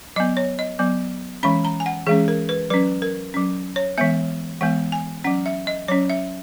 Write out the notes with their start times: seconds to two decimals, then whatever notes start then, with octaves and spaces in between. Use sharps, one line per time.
0.16 F#3 B3 D#5
0.37 C#5
0.59 D#5
0.79 F#3 B3
1.43 E3 G#3 C#4 B5
1.65 A#5
1.80 G#5
1.86 F#5
2.06 E3 G#3 C#4 G#4
2.28 A#4
2.49 B4
2.70 F#3 C#4 B4
3.02 A#4
3.34 F#3 C#4
3.76 C#5
3.98 E3 G#3 B3 E5
4.61 E3 G#3 B3 F#5
4.92 G#5
5.24 F#3 C#4 F#5
5.46 E5
5.67 D#5
5.88 F#3 C#4 C#5
6.10 E5